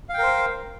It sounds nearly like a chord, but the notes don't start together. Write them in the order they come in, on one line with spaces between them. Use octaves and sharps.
F5 G5 A#4 C5